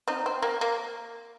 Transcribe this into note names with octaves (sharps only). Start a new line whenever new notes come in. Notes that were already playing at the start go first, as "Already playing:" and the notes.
C4 D#4
C4
A#3
A#3